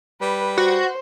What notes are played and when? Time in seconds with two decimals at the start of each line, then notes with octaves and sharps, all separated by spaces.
0.21 G3 B4
0.58 F#4 C5